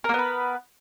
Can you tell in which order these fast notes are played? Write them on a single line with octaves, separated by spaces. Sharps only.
A#4 A#3 B3 B4